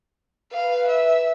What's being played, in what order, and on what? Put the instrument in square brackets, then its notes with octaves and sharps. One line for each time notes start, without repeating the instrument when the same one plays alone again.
[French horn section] B4 [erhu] F5
[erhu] E5